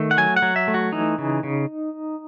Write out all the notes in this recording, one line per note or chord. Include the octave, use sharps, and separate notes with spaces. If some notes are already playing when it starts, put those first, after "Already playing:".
Already playing: D#3 A3
F#5
F#3 G#5
F#5
F#3
E5
A3
F#4
E3 D#4
C#3
C#3